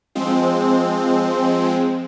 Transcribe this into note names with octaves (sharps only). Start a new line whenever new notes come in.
F3 G#3 C4